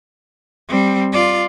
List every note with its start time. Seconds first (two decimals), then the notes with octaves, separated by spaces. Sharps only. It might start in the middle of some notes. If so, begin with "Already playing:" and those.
0.69 G3 C4
1.13 F4 D5